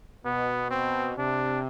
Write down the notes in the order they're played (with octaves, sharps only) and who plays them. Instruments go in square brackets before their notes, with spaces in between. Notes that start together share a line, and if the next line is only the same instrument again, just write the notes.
[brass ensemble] B2 [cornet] B3
[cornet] C4
[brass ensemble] C3 [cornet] D4